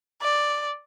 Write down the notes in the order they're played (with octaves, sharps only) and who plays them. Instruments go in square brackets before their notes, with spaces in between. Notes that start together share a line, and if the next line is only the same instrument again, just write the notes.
[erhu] D5